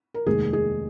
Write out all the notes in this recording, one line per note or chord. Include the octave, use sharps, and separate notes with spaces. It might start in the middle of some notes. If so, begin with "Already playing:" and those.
A#4
F1 D#2 D#3 G#3 G#4
G#4